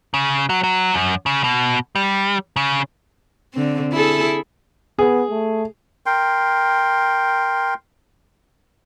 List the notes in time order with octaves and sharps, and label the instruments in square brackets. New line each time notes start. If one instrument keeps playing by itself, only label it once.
[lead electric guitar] C#3
F#3
F#3
F#2
C#3
B2
G3
C#3
[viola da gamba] D3 C4
E4 G#4 A4
[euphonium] B3 [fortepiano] G#4
[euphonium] A3
[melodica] A#4 G5 C6